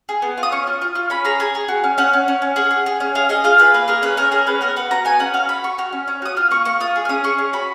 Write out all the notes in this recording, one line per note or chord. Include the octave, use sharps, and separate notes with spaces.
G#4
B3
F4
D#6
C#4 C#6
F4
F4
F4
C#4 B5
G#4 A#5
G#4 G#5
G#4
F#4
C#4
C#4 F#5
C#4
C#4
C#4
G#4 F#5
G#4
G#4
C#4
G#4 F5
G#4 D#5
F4 F5
G#4 B4
A#3 B4
G#4 A#4
C#4 B4
C#4 A#4
G#4 A#4
C#4 B4
B3 A#4
F#4 B4
F#4 A#5
B3 G#5
C#4 F#5
F#4 F5
F#4 B5
F#4 C#6
F#4 F6
C#4
C#4
F#4 D#6
F4 F6
A#3 C#6
A#3 C#6
F4 D#6
G#4
F6
C#4 D#6
G#4 C#6
C#4
F#4 B5